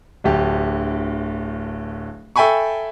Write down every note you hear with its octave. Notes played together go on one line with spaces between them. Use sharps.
D1 D2 G4
A4 E5 G5 G#5 B5 C#6